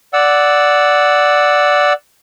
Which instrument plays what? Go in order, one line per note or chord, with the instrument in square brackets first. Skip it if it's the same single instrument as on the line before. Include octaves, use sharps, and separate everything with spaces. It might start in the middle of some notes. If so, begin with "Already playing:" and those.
[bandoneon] D5 F#5 E6